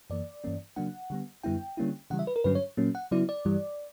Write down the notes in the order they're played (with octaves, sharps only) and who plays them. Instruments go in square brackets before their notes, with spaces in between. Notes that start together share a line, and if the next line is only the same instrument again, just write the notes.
[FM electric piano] F#2 E3 A#3 D5
G2 E3 A#3 C#4
C#3 F#3 A#3 D4 F#5
D3 G3 B3
F#2 D3 G3 B3 E4 G5
D3 G3 A#3 C#4 E4
C#3 E3 G3 F#5
E5
B4
A#4
G2 D3 F#3 C#4 B4
C#5
A#2 F#3 A#3 C#4
F#5
C#3 F#3 B3 E4 D5
D5
G2 E3 G3